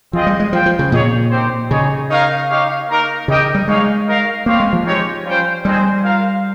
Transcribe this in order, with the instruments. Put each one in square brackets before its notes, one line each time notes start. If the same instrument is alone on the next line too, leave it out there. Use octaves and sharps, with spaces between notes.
[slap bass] F3 [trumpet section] C4 F4 G#4 D#5 G5
[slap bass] G3
G#3
[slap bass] F3 [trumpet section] F4 C5 G5
[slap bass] F3
C#3
[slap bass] A#2 [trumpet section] D#4 G#4 C#5
[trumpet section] C4 D#4 G4 C5
[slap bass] C#3 [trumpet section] D#4 G#4 C#5
[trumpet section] D#4 A#4 C#5 F5
D#4 G4 C#5 F5
A#3 D#4 A#4
[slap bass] C#3 [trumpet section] D#4 G4 A#4 D#5 G5
[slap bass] G3
[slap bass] G#3 [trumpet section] D#4 G#4 C#5 F5
[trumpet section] D#4 A#4 F5
[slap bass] A#3 [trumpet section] C4 G4 C#5 F5
[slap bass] G#3
F3
[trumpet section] G#3 C4 D#4 G4 C#5
G3 C#4 F4 C5 G5
[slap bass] G3 [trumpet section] G#3 C4 D#4 G#4 C5
[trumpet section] F4 A#4 F5